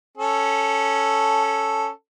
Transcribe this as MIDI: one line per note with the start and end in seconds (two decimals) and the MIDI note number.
0.18 1.89 61
0.18 1.89 69